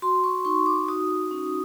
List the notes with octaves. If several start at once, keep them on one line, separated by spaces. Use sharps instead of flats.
F#4 C6
C#6
D#4 C#6
D6
F#4 D#6
C#4